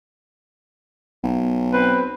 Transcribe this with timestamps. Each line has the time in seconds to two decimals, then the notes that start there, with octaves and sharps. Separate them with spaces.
1.23 B1
1.73 C4 B4